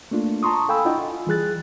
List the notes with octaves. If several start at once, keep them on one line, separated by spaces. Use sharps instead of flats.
A3 A#3 D4 F4
A5 A#5 C6 C#6 D#6
A4 F5 G5 G#5 B5 E6
D4 E4 F4 D#5 F#5 G5
F4
E3 G3 G#4 F#6 A6